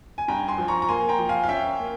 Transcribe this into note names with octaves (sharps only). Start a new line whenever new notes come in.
G#5
G2 G5 A#5
G#5 C6
F3
A#5 C#6
A#5
A#3 G#5 C6
G5 A#5
F3
F5 G#5
F5
C#4 E5 G5
A#3